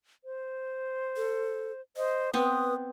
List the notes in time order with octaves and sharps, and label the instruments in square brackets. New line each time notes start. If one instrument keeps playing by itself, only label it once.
[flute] C5
[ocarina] A4
[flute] C5 [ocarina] D#5
[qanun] B3 C4 [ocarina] B4 [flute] D#6